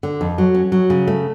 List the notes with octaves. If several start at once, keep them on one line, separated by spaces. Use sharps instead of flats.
D3
F2
F#3
C#4
F#3
C#3
A3